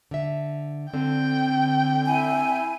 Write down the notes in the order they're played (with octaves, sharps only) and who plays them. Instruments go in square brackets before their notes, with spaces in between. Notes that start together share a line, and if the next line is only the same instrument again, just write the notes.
[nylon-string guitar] D3 E5
[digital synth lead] D3 [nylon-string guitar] C4 [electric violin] G5
[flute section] E4 G#5